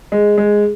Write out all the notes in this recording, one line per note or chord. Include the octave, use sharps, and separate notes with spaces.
G#3
G#3